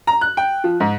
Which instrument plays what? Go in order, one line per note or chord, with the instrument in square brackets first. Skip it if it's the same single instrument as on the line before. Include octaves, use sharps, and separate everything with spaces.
[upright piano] A#5
F#6
G5
F3
G#2